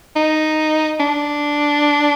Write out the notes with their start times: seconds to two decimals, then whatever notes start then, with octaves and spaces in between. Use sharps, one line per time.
0.16 D#4
1.00 D4